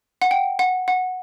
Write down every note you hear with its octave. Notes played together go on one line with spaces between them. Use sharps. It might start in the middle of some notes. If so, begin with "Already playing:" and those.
F#5
G5
F#5
F#5